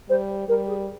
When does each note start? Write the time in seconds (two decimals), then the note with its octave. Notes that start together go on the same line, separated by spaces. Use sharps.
0.09 G3 C5
0.48 G3 A#4
0.68 G#4